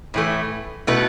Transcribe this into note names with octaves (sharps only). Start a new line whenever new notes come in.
A2 E3 A3
B2 A3 E4 B4